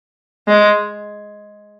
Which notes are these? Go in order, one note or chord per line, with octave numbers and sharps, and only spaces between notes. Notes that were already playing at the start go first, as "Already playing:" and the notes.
G#3